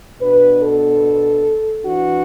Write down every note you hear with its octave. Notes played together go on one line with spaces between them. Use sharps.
B2 B3 D4 B4
A4
E3 D4 F#4